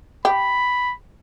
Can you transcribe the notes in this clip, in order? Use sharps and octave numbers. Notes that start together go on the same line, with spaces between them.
G4 B5